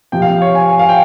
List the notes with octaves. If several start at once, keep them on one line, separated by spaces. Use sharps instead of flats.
F2 C3 F3 G5
F5
C#5
G#5
G#5
F5
G5